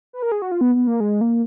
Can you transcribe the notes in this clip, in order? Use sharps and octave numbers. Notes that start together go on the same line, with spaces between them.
B4
A#4
G#4
F#4
F4
B3
B3
A#3
G#3
A#3